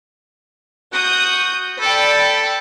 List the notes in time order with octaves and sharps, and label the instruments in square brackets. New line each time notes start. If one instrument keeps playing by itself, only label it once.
[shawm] F#4 [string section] D#6 G6
[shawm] A4 [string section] D5 G5 B5